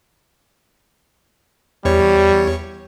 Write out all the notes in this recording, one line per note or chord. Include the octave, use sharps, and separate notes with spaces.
E2 G3 G4 C#5